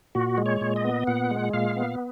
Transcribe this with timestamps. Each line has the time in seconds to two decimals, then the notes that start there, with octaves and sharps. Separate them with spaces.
0.15 A#2 F#4
0.38 G#3
0.46 C#5
0.61 A#2
0.76 D#5
0.84 B3
1.07 A#2 F#5
1.31 G#3
1.53 A#2 F5
1.77 B3